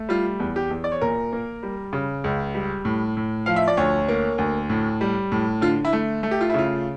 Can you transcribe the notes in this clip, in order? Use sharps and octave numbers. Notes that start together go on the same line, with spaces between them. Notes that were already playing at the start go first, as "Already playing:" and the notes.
Already playing: A3
G3 F4
E2
G4
E2
D5
C#5
A#2 A#4
A#3
G3
C#3
C#2
G3
A2
A2
F3 F5
E5
D5
D2 C#5
A#3
D2
A2
G3
A2
D3 F4
E4
A3
A3
G4
F4
E4
C#3 F4